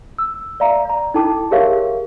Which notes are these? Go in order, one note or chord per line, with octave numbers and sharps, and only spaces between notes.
E6
D5 E5 F5 A#5
D5 A#5
D#4 E4 A4 G5 A5 D6
G4 G#4 A#4 C#5 E5 F5